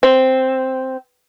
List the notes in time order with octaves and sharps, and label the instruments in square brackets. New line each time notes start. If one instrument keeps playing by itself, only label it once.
[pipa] C4